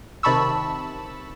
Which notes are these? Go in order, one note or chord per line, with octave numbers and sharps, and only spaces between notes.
C3 D#3 A5 B5 C#6 E6